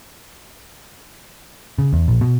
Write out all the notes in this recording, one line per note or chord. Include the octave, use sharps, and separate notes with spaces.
C#3
E2
A#1
B2